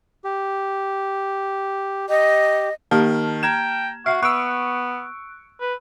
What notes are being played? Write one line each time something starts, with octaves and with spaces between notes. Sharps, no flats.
G4
G4 D#5
D#3 A#3 G4 A5 F6
G5 A#5 G#6 E7
F#4 E5 F#5 F6 C7
B3 C#6 E6 F#6 D7
B4